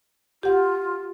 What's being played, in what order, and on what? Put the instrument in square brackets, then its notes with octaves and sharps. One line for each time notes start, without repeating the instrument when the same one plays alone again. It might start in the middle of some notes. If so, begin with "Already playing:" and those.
[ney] F4 [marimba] G4 F#5